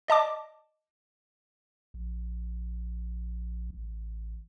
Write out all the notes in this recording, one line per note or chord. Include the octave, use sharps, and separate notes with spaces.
D5 D#5 A5 D6
A#1
A1